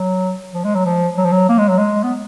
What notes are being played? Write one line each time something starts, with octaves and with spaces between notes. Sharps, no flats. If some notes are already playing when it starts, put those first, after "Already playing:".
Already playing: F#3
F3
G#3
F#3
F3
F#3
F3
F#3
A#3
G#3
F#3
G#3
B3